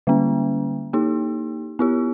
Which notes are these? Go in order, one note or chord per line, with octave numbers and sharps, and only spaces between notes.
D3 G3 A#3 C#4
A#3 D#4 G4
B3 E4 G4